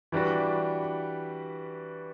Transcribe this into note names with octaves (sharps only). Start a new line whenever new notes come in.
E3 G3 D4 F#4 B4